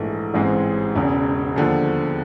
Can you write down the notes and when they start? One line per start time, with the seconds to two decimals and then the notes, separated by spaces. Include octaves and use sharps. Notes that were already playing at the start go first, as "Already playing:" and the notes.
Already playing: A#1 G#2 E3 A3
0.34 A1 G#2 E3 G#3 C4
0.95 E1 E2 C#3
1.56 D#2 D3 F3